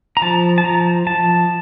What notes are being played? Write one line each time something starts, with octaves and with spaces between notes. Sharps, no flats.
A#5
F3 A5
A5
F3 A#5
F3 A5